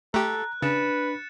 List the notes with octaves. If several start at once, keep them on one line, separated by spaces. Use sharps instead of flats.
A3 G4 A4 A#5 F#6
C#3 D4 B4 A6 C#7 E7